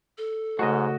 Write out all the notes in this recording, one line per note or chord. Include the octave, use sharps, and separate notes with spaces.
A4
G#2 C#3 A3 F#4 D#5